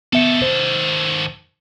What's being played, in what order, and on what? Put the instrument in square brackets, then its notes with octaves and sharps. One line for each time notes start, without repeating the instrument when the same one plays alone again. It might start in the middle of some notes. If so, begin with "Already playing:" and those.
[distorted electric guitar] D#3 A4 [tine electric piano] B3 E5 C#7
[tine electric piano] C5